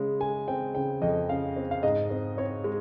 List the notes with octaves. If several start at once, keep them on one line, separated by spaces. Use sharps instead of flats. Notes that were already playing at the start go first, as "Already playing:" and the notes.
Already playing: C#3 G#3
G#3 G#5
C4 G5
C#3 G5
F2 D#5
C#3 F5
C4
F5
G#2 D#5
C4
C4 C#5
G#3